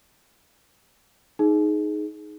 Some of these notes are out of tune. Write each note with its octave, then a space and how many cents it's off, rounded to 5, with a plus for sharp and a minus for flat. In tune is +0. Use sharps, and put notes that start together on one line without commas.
D#4 +0 G#4 +15